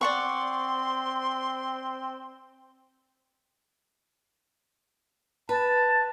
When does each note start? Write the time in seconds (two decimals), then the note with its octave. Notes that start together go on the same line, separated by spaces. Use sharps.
0.01 C4 D5 F#5 C6 C#6
5.49 B4 A5